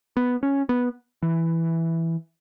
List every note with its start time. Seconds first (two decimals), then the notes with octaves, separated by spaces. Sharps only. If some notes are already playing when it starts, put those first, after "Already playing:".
0.17 B3
0.43 C#4
0.69 B3
1.22 E3